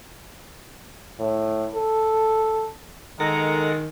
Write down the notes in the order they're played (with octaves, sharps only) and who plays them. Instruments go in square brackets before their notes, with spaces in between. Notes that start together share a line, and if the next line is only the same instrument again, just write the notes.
[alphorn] A2
A4
[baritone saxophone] D#3 [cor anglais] G#3 [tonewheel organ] A4 A#4 F#5 [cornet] A#5